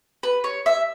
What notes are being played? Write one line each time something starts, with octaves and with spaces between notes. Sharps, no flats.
B4
C#5
E5